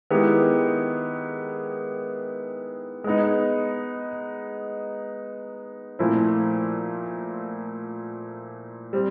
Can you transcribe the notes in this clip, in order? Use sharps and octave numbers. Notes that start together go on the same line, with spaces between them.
D#3 G#3 B3 E4 G4
G#3 B3 D#4
A#2 F3 A3 C4 E4
G3 C4